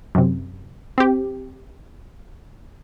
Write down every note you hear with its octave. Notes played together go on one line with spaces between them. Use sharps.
F#2 C3
C4 G4